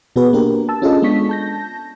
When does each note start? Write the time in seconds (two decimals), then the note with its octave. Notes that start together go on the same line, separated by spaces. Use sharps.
0.16 B2 B3 F#4 G#4 B4
0.33 A#3 D4 G4 A#4
0.69 A5 E6
0.82 C#4 D4 F4 G#4 A4 D#5
1.02 G#3 B3 D4 C#6 B6
1.29 A5 G6 A#6